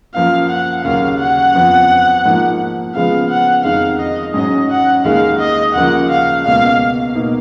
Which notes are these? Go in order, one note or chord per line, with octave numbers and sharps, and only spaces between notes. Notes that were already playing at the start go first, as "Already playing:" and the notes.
F#2 F3 A#3 F5
F#5
D#2 C#3 F#3 A#3 F5
F#5
F2 F3 B3
G#2 F3 A#3 D#4
C#3 F3 G#3 B3 F5
F#5
F2 D#3 G#3 D#4 F5
D#5
G#2 F#3 C#4 D#5
F#5
D#2 D#3 G#3 F5
D#5
D#2 C#3 F3 A#3 F#5
F5
C#2 B2 A#3 F5
B2 A#3 D#4